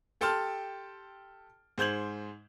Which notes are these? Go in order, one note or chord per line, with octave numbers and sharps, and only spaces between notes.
G4 A4 G5 A5 C6 F6
G#2 C5 G6 G#6 F#7